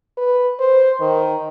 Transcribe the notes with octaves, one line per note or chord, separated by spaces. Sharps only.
B4
C5
D#3